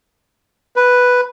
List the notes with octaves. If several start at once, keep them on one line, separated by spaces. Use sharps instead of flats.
B4